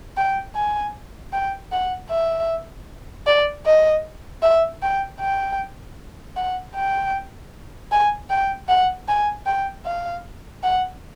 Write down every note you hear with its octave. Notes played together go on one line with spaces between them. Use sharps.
G5
G#5
G5
F#5
E5
D5
D#5
E5
G5
G5
F#5
G5
G#5
G5
F#5
G#5
G5
F5
F#5